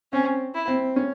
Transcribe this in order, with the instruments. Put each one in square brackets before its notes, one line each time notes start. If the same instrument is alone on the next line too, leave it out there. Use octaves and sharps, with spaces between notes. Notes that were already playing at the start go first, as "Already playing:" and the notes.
[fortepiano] C4 [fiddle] C#4
[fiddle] E4
[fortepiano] C4
C#4